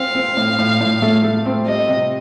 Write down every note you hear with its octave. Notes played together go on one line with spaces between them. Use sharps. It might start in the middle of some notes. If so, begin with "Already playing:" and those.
Already playing: C4 F5
C4
A2
A2
A2
A3
A3
C4
G3 D#5
C3